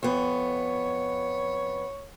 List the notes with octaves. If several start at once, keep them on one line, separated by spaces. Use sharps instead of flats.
F2 B3 C#5